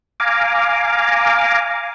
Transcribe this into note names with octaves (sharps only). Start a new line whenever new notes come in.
F5 G#5 A#5 D6